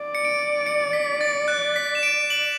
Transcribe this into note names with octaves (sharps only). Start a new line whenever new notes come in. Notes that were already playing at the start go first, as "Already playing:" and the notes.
Already playing: D5
C#7
D7
C#7
B6
A6
F#6
B6
E7
D7
F#7